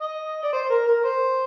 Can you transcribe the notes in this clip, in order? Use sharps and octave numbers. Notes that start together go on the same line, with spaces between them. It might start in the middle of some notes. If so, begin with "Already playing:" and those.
D#5
D5
C5
A#4
A#4
C5